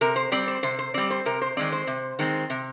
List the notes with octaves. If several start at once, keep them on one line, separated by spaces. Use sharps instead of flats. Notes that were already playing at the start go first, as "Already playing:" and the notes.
C3 A#4
C5
G3 C4 D5
C5
C3 C5
C5
G3 C4 D5
C5
C3 A#4
C5
D#3 G#3 C4 D5
C5
C3
D#3 G#3 C4
C3